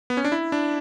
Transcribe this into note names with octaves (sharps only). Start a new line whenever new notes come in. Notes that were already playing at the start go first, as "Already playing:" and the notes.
B3
C#4
D4
E4
D4